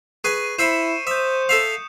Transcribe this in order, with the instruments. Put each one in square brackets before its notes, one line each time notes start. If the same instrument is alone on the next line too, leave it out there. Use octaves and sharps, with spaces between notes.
[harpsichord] G#4 B4 G#5 [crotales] C#6 D#7
[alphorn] E4 [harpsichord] C5 E5 B5 [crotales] C#7 E7
[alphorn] C5 [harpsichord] E5 [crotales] D#6 G6
[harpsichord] A4 E5 F5